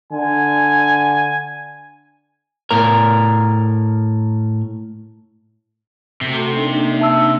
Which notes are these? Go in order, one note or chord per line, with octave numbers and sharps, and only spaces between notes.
D3 G#5
A2 A#4 A#5
C3 A3 F#4 A4
A#3 D4 D#4
E5 A5 E6